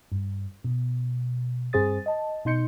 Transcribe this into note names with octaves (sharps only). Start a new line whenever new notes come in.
G2
B2
G2 C4 G#4 C5 D#6 A6
D#5 A5
B2 D#4 C6 G6 C#7